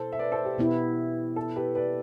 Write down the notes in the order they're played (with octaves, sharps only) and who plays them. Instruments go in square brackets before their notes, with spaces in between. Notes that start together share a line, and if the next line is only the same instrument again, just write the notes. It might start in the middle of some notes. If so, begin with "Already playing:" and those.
Already playing: [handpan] B2 B3 E4 [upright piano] A4 C5
[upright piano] E5
B4 D5
A4 C5
G4
[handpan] B2 B3 E4
[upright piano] A4
G4 B4
B4 D5